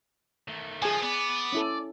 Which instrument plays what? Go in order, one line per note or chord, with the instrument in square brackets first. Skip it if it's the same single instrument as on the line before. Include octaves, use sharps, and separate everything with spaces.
[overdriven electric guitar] D#3 A3
[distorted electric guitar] F3 [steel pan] G#4 G#5
[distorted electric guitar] B3 [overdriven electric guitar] D5
[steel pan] C#4 E4 A4